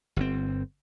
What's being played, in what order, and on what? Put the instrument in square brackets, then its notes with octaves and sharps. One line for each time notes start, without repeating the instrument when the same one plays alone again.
[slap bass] G1 C4